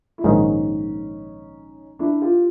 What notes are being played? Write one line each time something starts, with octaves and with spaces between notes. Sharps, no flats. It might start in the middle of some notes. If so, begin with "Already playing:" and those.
E4
A#1 G#2 D#3 C#4 D#4
D4 E4
F4 G4